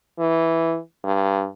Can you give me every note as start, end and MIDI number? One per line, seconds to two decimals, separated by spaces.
0.19 0.78 52
1.04 1.47 43